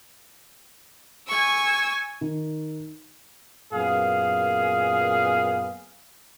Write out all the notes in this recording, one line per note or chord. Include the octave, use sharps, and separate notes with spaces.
G#5 C#6 E6
D#3
F#2 A#2 B3 G#4 F5